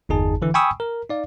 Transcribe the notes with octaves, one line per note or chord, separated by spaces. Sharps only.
G1 E2 D#4 G#4 A5
D3 E3 E4
G5 G#5 B5 C#6 D#6 E6
A#4
D#4 D5 F5